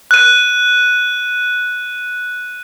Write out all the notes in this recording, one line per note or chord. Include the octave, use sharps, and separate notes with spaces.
F#6 D#7